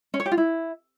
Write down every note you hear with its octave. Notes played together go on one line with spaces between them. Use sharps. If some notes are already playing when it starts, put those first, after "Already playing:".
C#4
C#5
G4
F4
E4